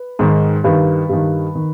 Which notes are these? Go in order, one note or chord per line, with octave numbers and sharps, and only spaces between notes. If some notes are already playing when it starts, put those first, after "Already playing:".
Already playing: B4
G#2 D#3
G2 D#3 B4
G2 D#3
D#3